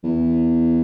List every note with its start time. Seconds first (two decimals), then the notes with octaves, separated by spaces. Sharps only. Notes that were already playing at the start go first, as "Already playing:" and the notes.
0.04 E2